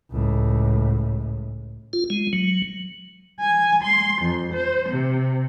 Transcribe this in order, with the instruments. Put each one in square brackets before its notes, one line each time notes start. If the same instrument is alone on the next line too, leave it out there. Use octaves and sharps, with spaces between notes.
[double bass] C#2 A2
[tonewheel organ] F4
G#3
F#3
[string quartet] G#5
C6
F2
C5
C3